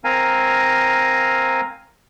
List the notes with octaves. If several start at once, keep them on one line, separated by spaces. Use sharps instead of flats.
C4 A#4 F5 G#5 A#5